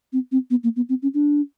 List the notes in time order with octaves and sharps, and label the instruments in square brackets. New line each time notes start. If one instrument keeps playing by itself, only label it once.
[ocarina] C4
C4
B3
A#3
B3
C4
C#4
D4